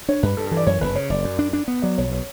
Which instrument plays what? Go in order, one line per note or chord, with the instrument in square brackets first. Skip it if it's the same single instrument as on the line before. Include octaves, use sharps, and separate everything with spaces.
[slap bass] D4 [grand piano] C#5
[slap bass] G2 [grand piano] B4
[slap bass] G2 [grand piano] A4
[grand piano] A4
[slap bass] E3
[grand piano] D5
[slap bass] F#2 [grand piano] C#5
[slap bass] F#1 [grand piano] B4
[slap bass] C#3 [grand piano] C#5
[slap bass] F#1 [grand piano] D5
[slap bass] F#2
D4
D4
B3
[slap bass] F#3 [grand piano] D5
[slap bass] B1 [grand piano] C#5
[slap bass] B2